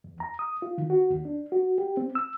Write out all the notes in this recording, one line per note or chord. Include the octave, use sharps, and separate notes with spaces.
E2
A#5
D#6
F4
D#3
F#4
D#2
D4
F#4
G4
C4
E6